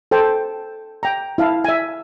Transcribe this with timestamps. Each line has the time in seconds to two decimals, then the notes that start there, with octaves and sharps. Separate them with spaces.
0.11 A4 C5 G5 A5
1.03 G5 A#5
1.38 E4 F5 A5
1.64 E5 G#5